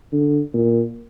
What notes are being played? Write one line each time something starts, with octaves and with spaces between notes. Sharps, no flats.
D3
A#2